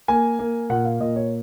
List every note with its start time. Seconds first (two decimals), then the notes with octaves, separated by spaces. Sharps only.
0.08 A#3 G#5
0.39 A#3
0.70 A#2 F#5
0.85 F5
1.00 A#2 D#5
1.16 C#5